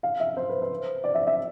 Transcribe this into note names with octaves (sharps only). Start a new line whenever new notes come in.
F5
E5
C5
B4
C5
D5
E5
E5